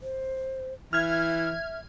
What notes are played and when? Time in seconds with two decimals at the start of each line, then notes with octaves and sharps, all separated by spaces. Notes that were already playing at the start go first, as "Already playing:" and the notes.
0.02 C5
0.93 E3 E5 F6 G#6